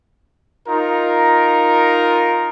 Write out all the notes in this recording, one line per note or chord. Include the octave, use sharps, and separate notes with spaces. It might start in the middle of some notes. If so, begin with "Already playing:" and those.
D#4 F4 A#4